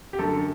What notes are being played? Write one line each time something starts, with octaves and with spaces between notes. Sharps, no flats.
G4
F#2 D3 A4